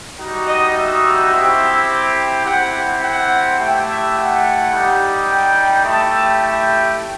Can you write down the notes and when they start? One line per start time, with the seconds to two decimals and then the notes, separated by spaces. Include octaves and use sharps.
0.19 G3 D#4 F#4
0.48 D#5
0.75 E5
1.32 C4 E4 G4
2.45 C4 E4 G4 F#5
3.02 F#5
3.59 A3 E4 G4 G5
3.87 E5
4.16 F#5
4.72 G3 D#4 G4
5.29 G5
5.85 A3 E4 G4 A5
6.43 G5